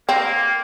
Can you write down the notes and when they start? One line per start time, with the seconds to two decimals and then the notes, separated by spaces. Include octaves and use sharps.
0.09 A#3 C4